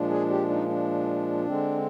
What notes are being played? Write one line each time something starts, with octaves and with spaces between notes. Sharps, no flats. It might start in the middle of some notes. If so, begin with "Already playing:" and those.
Already playing: A#2 F3 G#3 D4
G#4
G4
D#4
D4
D3 G#3 C4